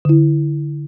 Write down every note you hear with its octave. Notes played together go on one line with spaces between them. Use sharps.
D3 E4